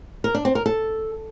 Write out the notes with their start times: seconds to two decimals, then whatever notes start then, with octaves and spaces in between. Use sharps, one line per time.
0.24 A#4
0.35 D4
0.45 C4
0.55 A#4
0.66 A4